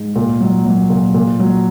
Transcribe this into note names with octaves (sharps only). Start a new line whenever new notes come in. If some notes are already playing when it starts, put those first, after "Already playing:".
Already playing: G#2
A#2
F#3
F#3
A#2
A#2
F#3